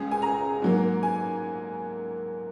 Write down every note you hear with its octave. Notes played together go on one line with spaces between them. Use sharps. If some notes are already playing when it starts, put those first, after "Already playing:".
Already playing: C#2 C#3 G#3 G#4
G#5
A#5
G#2 F#3 A#3
G#5